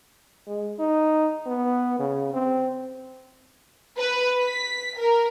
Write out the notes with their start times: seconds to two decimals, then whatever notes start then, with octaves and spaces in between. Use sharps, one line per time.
0.47 G#3
0.79 D#4
1.47 B3
2.00 C#3
2.34 C4
3.98 B4
4.41 B6
4.98 A#4